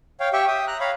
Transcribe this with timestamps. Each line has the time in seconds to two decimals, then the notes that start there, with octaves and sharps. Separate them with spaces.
0.20 C#5 F5 G5
0.33 G4 E5 G5 C#6
0.47 E5 G5 D#6
0.67 A#5 F#6
0.80 C#5 F5 A#5 B5